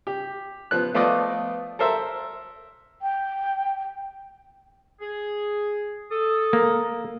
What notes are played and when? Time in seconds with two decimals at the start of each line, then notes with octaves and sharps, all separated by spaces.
0.07 G4
0.71 F3 B3 F#6
0.94 F3 A3 B3 F4 D5 D#5
1.79 A4 A#4 C5 E5
3.02 G5
5.01 G#4
6.11 A4 D#6
6.53 A#3